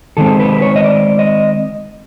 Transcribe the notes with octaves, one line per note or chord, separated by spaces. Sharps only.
D#3 G#3 C4 A4
B4
C#5
D#5
D5
D#5